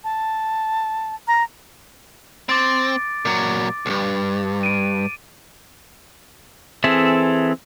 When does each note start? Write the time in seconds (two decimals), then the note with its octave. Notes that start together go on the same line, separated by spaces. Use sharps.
0.04 A5
1.28 A#5
2.49 C4 D6 A6 D7
3.25 A#2 F#3 D6
3.86 B1 G2
4.63 D7 D#7
6.84 E3 C4 G#4 A4 E5